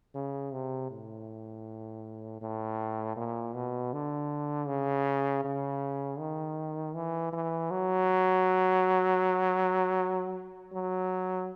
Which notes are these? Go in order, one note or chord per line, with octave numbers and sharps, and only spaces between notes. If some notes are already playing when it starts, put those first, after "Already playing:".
C#3
C3
A2
A2
A#2
B2
D3
C#3
C#3
D#3
E3
E3
F#3
F#3